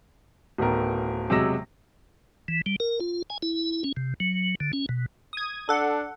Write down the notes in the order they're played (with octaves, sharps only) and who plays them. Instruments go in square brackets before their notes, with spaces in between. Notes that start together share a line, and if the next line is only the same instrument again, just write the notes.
[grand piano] D1 A2 D#3 B3 A#4
E1 C3 F#3 G#3 E6 A#6
[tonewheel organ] E3
G3
A#4
F4
G#5
E4
C#4
C3
F#3
D3
C#4
B2
[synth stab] D#6 G#6
[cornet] D4 [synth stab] A4 F#5